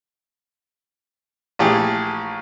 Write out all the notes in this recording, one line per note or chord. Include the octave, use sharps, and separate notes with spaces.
A#1 E3 A3 G4 G#4